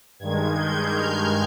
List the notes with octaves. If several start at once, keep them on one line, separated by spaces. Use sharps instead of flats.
G2 D#3 G#3 G#6
G6
F6